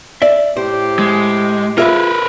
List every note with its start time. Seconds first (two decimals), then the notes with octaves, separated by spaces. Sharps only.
0.22 D5 E5
0.57 A2 G4 C5
0.99 G#3
1.78 F4 G#4 A#4 B4 E5